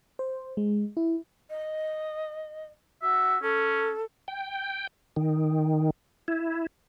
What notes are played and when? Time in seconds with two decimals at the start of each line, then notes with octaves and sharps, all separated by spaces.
0.19 C5
0.57 G#3
0.97 E4
1.50 D#5
3.02 F#4 E5
3.42 C#4 A4
4.28 G5
5.16 D#3
6.28 E4